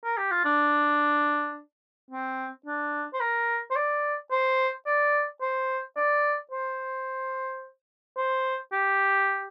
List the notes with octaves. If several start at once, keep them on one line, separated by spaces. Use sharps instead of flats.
A#4
G4
F4
D4
C4
D4
C5
A#4
C5
D5
C5
D5
C5
D5
C5
C5
G4